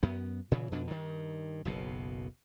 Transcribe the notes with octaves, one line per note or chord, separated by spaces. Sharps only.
F#2 B3
A#2 C#3 E3
F2 B2 D4
G2 D#3
F#1 B1 B2